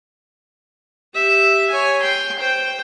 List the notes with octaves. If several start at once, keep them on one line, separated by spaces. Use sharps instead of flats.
G4 E5
C#5 G#5
G5 C6
C5 G5